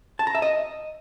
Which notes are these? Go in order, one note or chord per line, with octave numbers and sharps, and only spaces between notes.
A5
A#5
E5
D#5